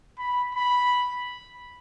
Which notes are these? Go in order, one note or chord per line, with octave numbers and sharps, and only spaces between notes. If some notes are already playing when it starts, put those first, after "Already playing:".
B5
B5